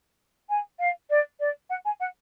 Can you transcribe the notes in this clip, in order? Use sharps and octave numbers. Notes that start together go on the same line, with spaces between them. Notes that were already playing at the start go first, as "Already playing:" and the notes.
G#5
F5
D5
D5
F#5
G#5
F#5